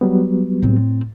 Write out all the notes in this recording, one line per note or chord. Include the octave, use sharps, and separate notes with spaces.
F#3 G3 B3
A2 C4